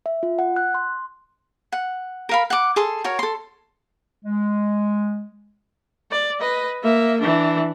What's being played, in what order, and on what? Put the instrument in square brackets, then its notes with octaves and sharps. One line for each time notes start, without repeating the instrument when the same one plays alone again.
[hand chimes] E5
F4
F#5
F#6
C6
[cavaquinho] F#5
A#4 F5 B5
F#5 D6
G#4 A4 C6
F#4 A#4 C#5
A4 C6
[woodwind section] G#3
[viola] D5
B4 D#5
A#3 E5
E3 D4